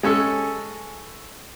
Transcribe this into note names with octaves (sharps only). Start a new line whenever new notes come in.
G#3 C#4 A4